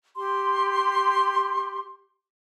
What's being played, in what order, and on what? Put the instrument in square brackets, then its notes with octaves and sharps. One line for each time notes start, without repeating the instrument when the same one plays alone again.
[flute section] G4 C6